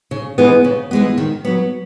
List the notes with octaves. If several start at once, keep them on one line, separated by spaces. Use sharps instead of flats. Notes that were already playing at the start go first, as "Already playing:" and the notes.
C#3
E3 G#3 B3
C#3
E3 G#3 B3
D#3
F#3 B3